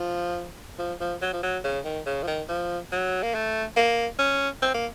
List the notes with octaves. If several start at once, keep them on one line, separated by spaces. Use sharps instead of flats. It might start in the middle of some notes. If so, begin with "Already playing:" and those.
Already playing: F3
F3
F3
F#3
F3
F#3
C#3
D#3
C#3
F3
D#3
F3
F#3
A#3
A3
A#3
C#4
C4
A#3